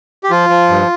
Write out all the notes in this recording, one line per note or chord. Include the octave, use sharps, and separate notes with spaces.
G4
F3 F4
F3
G2